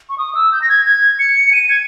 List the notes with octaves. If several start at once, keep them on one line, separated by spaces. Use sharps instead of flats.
C#6
D#6
E6
G6
A#6
G#6
G#6
C#7
D#7
G#6